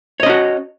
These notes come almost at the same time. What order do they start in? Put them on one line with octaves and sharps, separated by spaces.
C#5 D#5 C#4 F#4